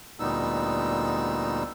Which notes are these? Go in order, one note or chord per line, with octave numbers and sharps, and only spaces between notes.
D2 A#2 G3 B3 D#4 E6